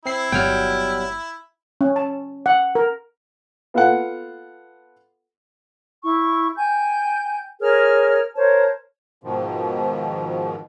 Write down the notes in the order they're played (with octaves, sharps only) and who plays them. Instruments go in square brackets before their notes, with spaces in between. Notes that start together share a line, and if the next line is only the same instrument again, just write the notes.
[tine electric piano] C4 C7 [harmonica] E4
[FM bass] G1 [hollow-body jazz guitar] B2 F#3 G3 [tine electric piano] G5 F6
[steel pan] C#4
A5
F#5
A#4
[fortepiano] B3 F4 A4 F5 F#5
[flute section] E4 C#6
G5 G#5 G6
G#4 A#4 C#5 F6
A#4 C5 C#5 A5
[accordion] G#2 B2 D#3 F3